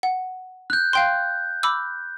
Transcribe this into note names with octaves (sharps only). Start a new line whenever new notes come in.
F#5
F#6 G6
F5 G5 C6
B5 D6 E6